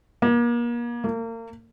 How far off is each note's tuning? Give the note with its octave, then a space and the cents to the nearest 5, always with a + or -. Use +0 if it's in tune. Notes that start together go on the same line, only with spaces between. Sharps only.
A#3 +35
A#3 -35